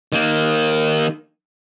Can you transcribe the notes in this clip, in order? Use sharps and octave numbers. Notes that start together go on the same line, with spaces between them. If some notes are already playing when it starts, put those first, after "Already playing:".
D#3 A#3